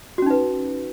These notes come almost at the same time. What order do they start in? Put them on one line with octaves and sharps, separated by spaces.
F#4 C#4 D#4 B4